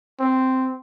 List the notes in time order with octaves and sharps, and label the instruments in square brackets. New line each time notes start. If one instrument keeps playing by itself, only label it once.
[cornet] C4